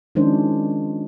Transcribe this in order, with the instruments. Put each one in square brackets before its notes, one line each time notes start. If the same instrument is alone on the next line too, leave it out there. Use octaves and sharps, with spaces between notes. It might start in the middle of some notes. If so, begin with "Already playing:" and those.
[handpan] D#3 F3 G#3 C#4 D4 C5